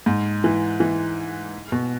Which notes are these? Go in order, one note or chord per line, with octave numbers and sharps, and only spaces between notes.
G#2
E3
E3
B2